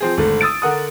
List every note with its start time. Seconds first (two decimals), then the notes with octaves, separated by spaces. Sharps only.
0.01 F3 C4 G#4
0.17 G#1 D3 A3
0.41 D#6 E6 A6 D7
0.62 D3 A#4 F#5 D#6